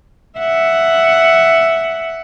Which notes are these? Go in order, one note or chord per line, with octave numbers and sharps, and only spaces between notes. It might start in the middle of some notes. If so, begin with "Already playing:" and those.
E5 F#5